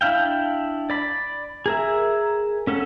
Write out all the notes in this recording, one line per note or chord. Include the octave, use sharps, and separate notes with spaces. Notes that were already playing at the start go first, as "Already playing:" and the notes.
D4 E4 F5 G5
D5 B5
G#4 A#4 E5
C#4 A4 F#5